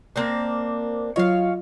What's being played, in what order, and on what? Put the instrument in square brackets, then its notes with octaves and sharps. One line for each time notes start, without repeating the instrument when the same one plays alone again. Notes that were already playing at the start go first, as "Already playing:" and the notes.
[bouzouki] A#3 C4 D4
[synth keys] F#3 F4 D#5 [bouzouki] C#5 F5